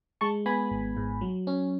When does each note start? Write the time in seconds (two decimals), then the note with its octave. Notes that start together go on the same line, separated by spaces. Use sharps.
0.21 G#3 A5 C#6
0.46 B3 G#5 B5
0.71 G#1
0.97 G#2
1.21 F#3
1.47 C#4